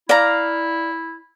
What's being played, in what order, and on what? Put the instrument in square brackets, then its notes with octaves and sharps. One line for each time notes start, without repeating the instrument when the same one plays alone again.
[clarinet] E4 [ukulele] D5 [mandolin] F5 A#5